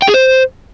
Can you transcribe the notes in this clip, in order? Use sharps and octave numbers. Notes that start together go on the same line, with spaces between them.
G5
G#4
C5